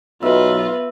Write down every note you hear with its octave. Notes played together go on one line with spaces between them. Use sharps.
B1 B3 D#4 F4 B4 E5 E6